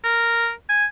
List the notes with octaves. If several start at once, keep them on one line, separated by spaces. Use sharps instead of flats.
A#4
G#5